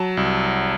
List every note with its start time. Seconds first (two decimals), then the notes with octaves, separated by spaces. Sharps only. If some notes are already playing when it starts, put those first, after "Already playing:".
Already playing: F#3 A5
0.17 C2